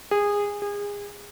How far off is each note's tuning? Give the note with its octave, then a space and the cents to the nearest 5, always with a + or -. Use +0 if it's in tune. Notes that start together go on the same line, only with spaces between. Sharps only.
G#4 -20
G#4 -30